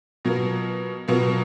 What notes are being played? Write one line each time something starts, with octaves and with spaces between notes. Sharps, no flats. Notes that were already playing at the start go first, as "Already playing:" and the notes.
B2 F#3 B3 F4 A#4
B2 F#3 B3 F4 A#4